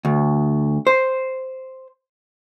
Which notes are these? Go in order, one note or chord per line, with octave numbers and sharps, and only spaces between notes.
D2
C5